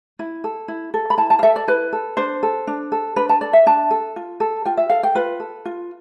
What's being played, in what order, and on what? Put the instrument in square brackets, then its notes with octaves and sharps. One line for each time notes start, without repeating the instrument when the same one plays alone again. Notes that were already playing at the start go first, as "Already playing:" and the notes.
[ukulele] E4
A4
E4
A4
B5
E4 A5
A5
F5
A4 E5
D5
E4 B4
A4
D4 C5
A4
D4
A4
D4 B4
A5
A4 D5
E5
D4 A5
A4
F4
A4
F4 G5
E5
A4 F5
G5
F4 B4
A4
F4